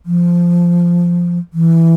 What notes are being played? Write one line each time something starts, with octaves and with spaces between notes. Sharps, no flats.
F3
E3